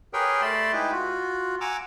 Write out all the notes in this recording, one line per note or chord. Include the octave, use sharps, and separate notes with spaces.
G4 G#4 A#4 B4 C#5 G5
A3 D5 A5 B5 C6
G#3 D#4 E4 G4 B4
F4 F#4
F#5 G#5 A#5 D6 E6